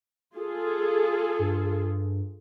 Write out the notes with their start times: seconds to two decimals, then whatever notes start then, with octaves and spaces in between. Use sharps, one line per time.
0.36 F4 G#4 A4
1.39 G2